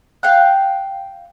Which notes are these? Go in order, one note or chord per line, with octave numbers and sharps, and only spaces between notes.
F5 G5 F#6